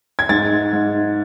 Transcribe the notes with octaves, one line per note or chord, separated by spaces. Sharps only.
G#6
G#2 A6
G#2